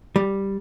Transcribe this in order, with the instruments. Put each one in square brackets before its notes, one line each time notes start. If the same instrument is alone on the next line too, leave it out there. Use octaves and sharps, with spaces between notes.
[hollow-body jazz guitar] G3